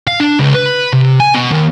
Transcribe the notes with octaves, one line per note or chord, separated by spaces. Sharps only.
F5
D4
C#2
B4
C3
G#5
B2
D#2